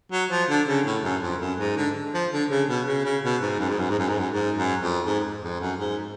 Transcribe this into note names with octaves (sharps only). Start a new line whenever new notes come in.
F#3
F3
D3
C#3
A2
F#2
F2
F#2
G#2
D3
F3
D3
C#3
B2
C#3
C#3
B2
G#2
F#2
G#2
F#2
G#2
F#2
G#2
F#2
G#2
F#2
F2
G#2
F2
F#2
G#2